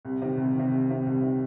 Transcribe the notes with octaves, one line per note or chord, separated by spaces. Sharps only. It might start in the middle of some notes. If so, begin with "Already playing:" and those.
C2
C3 D#3
C2
C3 D#3
C2
C3 D#3
C2
C3 D#3